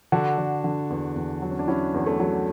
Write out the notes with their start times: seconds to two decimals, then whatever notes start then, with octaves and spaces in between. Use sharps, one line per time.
0.12 D3 D4 F#4
0.38 D3
0.64 D3
0.90 E2
1.16 E2
1.42 F#3
1.51 C#4
1.59 D4
1.68 F#3 C#4 E4
1.94 E2
2.06 A3
2.20 F#3